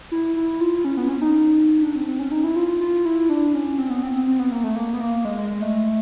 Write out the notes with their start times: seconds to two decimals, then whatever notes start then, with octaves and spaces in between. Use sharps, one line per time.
0.11 E4
0.36 E4
0.60 F4
0.85 C#4
0.97 B3
1.10 C#4
1.22 D#4
1.83 D4
1.95 C4
2.07 C4
2.19 C#4
2.32 D#4
2.44 E4
2.56 F4
2.68 F4
2.81 F4
3.05 E4
3.29 D4
3.54 C#4
3.78 C4
3.90 B3
4.03 C4
4.15 C4
4.27 C4
4.39 B3
4.52 A#3
4.64 A3
4.76 A#3
4.94 B3
5.00 A#3
5.25 G#3
5.37 G#3
5.50 G#3
5.62 A3